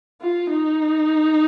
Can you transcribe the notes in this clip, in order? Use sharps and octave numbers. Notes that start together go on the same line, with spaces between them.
F4
D#4